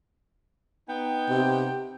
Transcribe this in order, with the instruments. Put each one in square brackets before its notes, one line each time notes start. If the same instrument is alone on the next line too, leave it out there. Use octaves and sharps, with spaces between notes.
[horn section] B3 D#4 G5
[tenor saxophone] C3